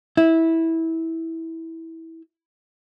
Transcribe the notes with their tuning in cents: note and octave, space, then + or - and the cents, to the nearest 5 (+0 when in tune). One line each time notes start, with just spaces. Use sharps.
E4 -15